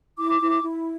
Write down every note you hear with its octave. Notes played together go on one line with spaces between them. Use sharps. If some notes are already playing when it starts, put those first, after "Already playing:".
E4 D6
E4
E4